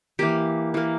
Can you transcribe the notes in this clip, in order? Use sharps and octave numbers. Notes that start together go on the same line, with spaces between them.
E3 A#3 G4
E3 A#3